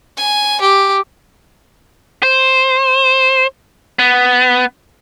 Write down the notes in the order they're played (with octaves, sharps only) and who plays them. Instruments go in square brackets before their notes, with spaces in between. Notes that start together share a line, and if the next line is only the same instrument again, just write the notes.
[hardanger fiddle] G#5
G4
[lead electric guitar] C5
B3